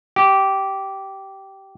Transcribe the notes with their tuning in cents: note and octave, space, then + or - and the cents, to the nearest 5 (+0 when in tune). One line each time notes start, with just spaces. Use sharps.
G4 -15